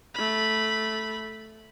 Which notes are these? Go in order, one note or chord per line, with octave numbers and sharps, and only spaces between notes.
A3 B5